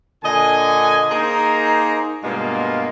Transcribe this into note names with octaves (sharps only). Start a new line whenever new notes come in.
A#2 D3 D#5 G#5
A#3 D#4 G#4 A#4 C5
G2 B2 G#3 A#3 F4